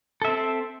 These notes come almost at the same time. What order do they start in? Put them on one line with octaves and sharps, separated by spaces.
A4 E5 C4